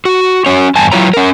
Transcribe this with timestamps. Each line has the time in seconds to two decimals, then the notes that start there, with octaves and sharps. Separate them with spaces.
0.05 F#4
0.46 C#4 F#4 C#5
0.76 E2 G2 G#5 A5
0.92 F#3 E4 F4 C#5 A#5
1.14 C#4 A#4